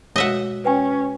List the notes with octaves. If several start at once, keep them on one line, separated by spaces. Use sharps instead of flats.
B2 G#3 F#4 C#5 D#5 E5 F#5
C#4 B4 G5 G#5